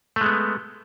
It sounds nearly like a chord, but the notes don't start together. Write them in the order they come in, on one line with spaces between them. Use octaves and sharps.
A3 G#3 B3